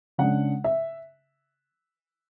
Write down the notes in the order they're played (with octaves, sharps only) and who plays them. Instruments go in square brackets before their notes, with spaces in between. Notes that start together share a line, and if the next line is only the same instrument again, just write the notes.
[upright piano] C#3 G#3 D4 F#5
E5